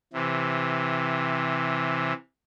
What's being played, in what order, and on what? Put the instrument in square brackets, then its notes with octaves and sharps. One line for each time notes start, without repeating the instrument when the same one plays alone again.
[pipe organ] C3 E3